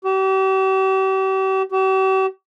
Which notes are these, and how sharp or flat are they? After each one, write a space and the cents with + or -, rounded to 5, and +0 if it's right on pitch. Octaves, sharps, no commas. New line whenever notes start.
G4 -40
G4 -45